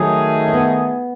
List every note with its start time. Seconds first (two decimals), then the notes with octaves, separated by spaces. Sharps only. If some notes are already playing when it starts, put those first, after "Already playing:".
Already playing: D#3 F#3 A3 D#4 G#4
0.48 C#4
0.53 B3